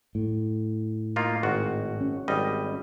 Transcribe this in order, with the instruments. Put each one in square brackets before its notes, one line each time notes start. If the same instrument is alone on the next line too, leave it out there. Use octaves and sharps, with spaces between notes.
[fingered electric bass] A2
[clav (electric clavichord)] A#3 D#4 F4
G#1 F#4
[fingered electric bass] C#4
[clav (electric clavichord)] G#1 G3 D#5